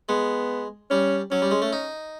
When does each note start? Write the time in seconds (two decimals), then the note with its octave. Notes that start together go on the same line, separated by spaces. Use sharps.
0.09 G#3 B3
0.91 G3 C#4
1.31 F#3 C#4
1.42 G3
1.51 G#3
1.62 A3
1.73 D#4